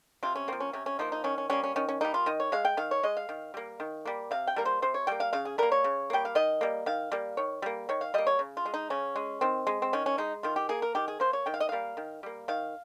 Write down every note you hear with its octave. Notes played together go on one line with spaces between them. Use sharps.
C3 F4
C#4
F3 A#3 C4
C#4
C3 C#4
C#4
F3 A#3 D#4
D#4
D#3 C#4
C#4
G3 A#3 C#4
C#4
D#3 C#4
C#4
G3 A#3 D#4
F4
D#3 D#5
C#5
G#3 F5
G5
D#3 F5
C#5
G#3 D#5
F5
D#3
G3 A#3
D#3
G3 A#3
C3 F5
G5
G3 A#3 A#4
C5
C3 C5
C#5
G3 A#3 G5
F5
C#3 F5
G#4
G3 A#3 A#4
C#5
C#3
G3 A#3 G5
F5
D#3 D#5
G3 A#3
D#3 F5
G3 A#3
D#3 C#5
G3 A#3
D#3 C#5
F5
G3 A#3 D#5
C#5
C#3
F4
G#3
D#4
C#3 C#4
G#3
D#3 C4
G#3
C4
D#3 C#4
C#4
G#3 D#4
D#3 F4
G4
A#3 G#4
A#4
D#3 G4
G#4
A#3 C5
C#5
D#3 G5
F5
D#5
G3 A#3 F5
D#3
G3 A#3
D#3 F5